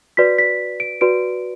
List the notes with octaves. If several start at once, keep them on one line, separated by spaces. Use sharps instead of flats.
F#4 B4 D5 B6
B6
D7
F#4 B4 D5 D7